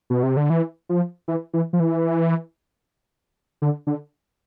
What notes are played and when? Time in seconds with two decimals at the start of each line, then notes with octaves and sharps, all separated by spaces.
0.10 B2
0.23 C3
0.37 D3
0.50 E3
0.89 F3
1.28 E3
1.53 E3
1.73 F3
1.80 E3
3.62 D3
3.87 D3